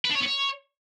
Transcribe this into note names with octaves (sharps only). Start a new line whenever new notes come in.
B4
D4
C#5
B3
C#5